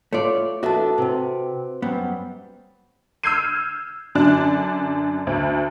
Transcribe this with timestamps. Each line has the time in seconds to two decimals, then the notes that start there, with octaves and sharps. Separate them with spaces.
0.13 A3 F4 C#5 D5
0.63 E2 D4 F#4 A4 E5 A5
0.98 C3 B4 C5
1.82 F#2 G3 B3
3.23 E6 F6 G6 G#6 C7 D#7
4.15 F#2 D3 D4 F#6
5.27 D2